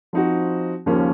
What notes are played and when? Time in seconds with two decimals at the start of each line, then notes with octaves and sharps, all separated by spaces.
0.13 F3 C4 D#4 F#4
0.86 D#2 C#3 F3 A#3 C#4